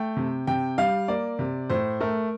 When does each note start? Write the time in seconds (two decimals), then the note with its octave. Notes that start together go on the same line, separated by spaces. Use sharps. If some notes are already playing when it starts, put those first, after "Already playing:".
Already playing: A3 G5
0.17 C3
0.47 C3 G5
0.78 G3 F5
1.08 A#3 D5
1.39 C3
1.69 A2 C5
2.01 A3 A#4